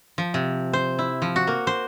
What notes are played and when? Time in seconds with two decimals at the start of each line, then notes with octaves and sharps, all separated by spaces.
0.18 F3
0.34 C3
0.73 C5
0.99 E4
1.22 F3
1.36 F#4
1.47 A#3
1.67 C5